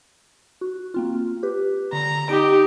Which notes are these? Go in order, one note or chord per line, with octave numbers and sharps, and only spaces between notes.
F#4
A#3 C4 F4
G4 B4
D3 A#5
D#4 G4 D7